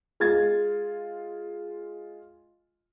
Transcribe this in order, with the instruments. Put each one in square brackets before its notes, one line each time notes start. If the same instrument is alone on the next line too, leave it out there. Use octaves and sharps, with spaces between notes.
[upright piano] G#3 F4 G#6 A6